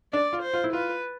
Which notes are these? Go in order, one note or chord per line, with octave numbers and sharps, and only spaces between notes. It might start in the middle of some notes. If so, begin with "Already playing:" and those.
D4 D5
F4
C5
F4
E4
F4 B4